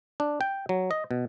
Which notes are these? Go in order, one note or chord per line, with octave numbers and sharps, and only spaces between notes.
D4
G5
F#3
D#5
B2